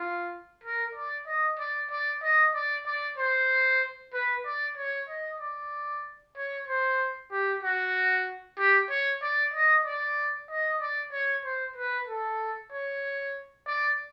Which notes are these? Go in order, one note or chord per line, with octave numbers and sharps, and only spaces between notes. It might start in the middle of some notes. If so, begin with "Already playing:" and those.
Already playing: F4
A#4
D5
D#5
D5
D5
D#5
D5
D5
C5
B4
D5
C#5
D#5
D5
C#5
C5
G4
F#4
G4
C#5
D5
D#5
D5
D#5
D5
C#5
C5
B4
A4
C#5
D5